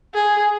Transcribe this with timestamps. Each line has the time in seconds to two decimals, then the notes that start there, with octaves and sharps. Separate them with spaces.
0.14 G#4